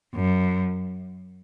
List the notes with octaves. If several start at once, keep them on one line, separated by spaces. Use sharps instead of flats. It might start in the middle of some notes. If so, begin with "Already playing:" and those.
F#2